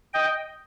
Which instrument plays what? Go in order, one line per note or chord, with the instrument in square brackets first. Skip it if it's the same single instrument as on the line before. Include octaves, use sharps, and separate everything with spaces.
[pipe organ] D#5 G5